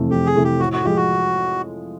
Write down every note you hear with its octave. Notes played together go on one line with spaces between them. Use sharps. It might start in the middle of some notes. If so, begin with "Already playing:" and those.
Already playing: F2 C3 E3 A3
F2 G4
G#4
C3 E3 A3
G4
A2 F#4
F#4
F3 G#3 G4
F#4